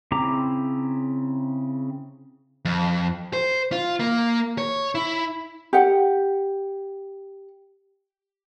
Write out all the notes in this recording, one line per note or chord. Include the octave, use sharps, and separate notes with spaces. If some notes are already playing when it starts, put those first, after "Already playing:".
C#3 C4 E4 A#5 D6
F2
C5
F4
A#3
C#5
E4
G4 F#5